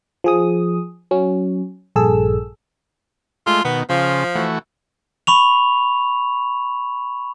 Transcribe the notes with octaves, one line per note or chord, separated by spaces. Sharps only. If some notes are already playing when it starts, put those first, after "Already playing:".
F3 G#4 D#6
F#3 C#4
A#1 G2 G#4 A4 E6
G#3 A3 F4
B2 D#3 B3
C#3 F3 F4
E3 A3 F#4
B5 C#6 F7